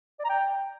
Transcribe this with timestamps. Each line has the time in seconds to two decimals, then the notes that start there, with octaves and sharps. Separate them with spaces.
0.19 D5
0.24 A#5
0.29 G5